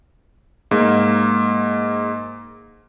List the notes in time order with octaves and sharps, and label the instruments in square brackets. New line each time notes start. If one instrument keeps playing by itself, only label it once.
[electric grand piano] G#2 A#3